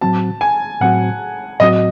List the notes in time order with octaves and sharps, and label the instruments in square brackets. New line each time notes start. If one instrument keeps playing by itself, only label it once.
[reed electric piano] A2 F#3 C4 F#4 [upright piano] A5
[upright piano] G#5
[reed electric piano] A2 F#3 C4 F#4 [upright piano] F#5
[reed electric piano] A2 F#3 C4 F#4 [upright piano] D#5